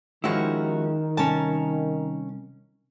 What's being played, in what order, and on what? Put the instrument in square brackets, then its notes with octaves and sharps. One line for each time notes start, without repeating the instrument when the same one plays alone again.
[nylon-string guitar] D#2 C#4 F#4 [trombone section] D#3 [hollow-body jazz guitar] F3 G#3 E4
[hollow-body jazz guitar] C2 [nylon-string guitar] C#4 A#4 A5